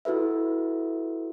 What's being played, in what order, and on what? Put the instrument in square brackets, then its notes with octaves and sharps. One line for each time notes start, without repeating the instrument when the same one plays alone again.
[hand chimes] E4 F#4 A4 B4 E5